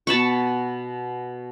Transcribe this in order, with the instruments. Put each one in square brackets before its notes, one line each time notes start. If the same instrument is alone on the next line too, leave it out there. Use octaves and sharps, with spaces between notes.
[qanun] B2 A5 B5 C#6